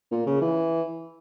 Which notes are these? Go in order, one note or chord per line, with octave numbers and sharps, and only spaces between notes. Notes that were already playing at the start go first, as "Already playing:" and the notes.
A#2
C#3
E3